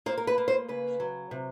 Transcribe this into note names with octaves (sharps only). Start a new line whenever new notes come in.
A#3 C5
A#4
B4
A#3
C5
C#3 B4
F#3
C3